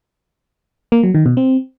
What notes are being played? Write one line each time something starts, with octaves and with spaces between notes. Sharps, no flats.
A#3
F#3
D#3
B2
C4